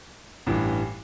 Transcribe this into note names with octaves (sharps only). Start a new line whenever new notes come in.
A1 G2 E3